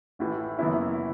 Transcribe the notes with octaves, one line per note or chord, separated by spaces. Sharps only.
A1 A2 E3
F#1 F#2 E3 B3 E4